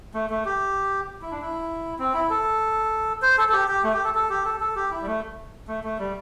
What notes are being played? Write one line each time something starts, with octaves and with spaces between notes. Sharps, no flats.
A3
A3
G4
E4
D4
E4
C4
E4
A4
C5
A4
A4
G4
G4
A3
G4
A4
A4
G4
A4
A4
G4
E4
G3
A3
A3
A3
G3